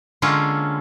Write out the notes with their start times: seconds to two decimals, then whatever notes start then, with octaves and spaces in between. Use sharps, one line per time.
0.22 D3 G#3 A#3 C#4 F4 A4